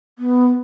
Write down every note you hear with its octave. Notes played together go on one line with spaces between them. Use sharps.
B3